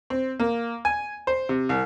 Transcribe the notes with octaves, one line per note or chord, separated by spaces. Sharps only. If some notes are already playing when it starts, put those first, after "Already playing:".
C4
A#3
G#5
C5
C3
C2